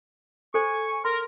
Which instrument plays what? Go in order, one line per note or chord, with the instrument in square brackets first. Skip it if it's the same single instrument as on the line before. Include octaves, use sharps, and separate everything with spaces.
[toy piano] A4 C5 [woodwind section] G#5 C#6
[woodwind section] A#4 [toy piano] C6